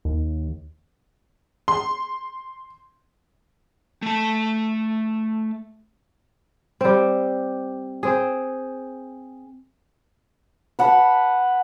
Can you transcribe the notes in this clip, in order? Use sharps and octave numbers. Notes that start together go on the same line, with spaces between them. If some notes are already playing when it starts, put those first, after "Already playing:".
D#2
C6
A3 A5
G3 C4
C4 G#4
B4 F#5 A5 B5